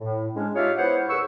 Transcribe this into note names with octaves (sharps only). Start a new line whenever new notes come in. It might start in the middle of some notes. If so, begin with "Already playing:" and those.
A2
G#3 C#4 D4
D#4 F4 G4 C#5 E5 F5
B3 E4 C5 C#5 F#5
D#2 G#4 B4 C#6 E6